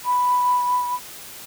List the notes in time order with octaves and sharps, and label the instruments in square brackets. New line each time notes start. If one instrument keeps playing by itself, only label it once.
[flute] B5